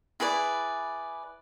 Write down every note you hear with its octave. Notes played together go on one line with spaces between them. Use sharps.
E4 G#4 B4 D5